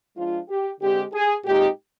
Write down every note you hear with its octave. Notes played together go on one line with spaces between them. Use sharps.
F3 G#3 D4 F4
G4
D3 G#3 C4 G4
G#4
A#2 G#3 C4 D#4 G4